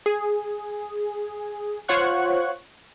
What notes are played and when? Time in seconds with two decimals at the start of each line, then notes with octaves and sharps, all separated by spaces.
0.06 G#4
1.88 F4 C5 C#5 F#5 C#6 F#6